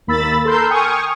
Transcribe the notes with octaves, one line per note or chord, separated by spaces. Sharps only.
D#2 A#3 B5 E6 A6
A4 A#4 C6 E6 G6
G5 G#5 C#6 D#6 F6